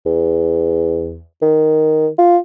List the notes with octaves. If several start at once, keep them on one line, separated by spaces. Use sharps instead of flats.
E2
D#3
F4